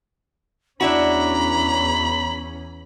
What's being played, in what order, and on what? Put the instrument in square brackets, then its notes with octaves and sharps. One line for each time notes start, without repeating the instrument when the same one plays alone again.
[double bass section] E2 C#4 [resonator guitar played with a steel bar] D4 E4 F#4 [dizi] A#5 [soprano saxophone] B5